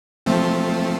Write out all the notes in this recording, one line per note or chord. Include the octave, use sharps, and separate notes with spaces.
F3 A3 C4